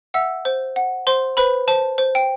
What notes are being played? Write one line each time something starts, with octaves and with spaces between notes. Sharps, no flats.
E5 F#5 E6
C5
F#5
C5 C6
B4 C5 B5
C5 A5
C5
G5